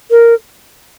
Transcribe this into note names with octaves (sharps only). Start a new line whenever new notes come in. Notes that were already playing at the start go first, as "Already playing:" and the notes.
A#4